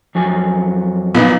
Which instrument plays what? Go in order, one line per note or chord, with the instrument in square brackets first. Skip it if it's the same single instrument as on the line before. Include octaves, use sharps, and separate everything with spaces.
[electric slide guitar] F2 F#3 G#5
[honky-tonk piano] A#2 D#4 [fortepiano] B3